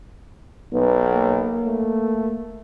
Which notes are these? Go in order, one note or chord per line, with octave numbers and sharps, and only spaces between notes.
B1 B3
A#3
A3